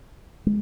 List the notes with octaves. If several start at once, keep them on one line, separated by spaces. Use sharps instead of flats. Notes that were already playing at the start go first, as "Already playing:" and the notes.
G#3